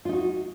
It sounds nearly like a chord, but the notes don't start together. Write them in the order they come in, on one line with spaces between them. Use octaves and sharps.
F4 D#4 F#4